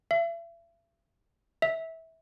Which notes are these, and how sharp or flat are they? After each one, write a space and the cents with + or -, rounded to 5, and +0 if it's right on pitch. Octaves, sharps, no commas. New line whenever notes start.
E5 +40
E5 -20